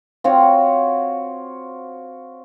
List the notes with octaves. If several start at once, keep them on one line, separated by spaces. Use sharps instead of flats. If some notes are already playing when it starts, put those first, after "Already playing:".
C4 F4 F#4 C#5